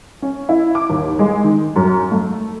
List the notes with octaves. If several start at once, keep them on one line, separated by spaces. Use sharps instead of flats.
C#4
E4
D6
D#2
G#3
D#3
F#2
A3